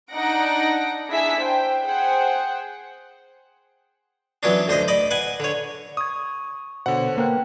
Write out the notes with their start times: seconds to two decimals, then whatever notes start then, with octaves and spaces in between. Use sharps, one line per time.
0.12 D4 D#4 F#5 A#6 D7
1.08 D4 E4 G#4 E5 B6
1.40 C5 G5
1.84 G#4 C5 F#5 G5
4.43 E3 F#3 B3 C#4 D4
4.68 D2 D4 C5 D#5
4.88 D5 D#5 B5
5.11 B4 F#5 G#5
5.40 D3 C#5
5.97 C#6 D#6 G#6
6.86 B2 D3 C5 C#5 F#5
7.18 A#3 B4 G5 F#6